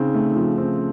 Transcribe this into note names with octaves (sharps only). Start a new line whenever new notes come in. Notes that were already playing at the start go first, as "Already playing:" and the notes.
Already playing: C#3 C4 D#4
A3
F3
C4 C#4